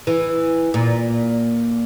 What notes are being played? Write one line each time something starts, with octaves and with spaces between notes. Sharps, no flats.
E3
A#2